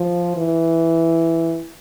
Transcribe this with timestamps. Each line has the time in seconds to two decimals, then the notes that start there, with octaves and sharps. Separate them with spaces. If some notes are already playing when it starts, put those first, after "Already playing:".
Already playing: F3
0.37 E3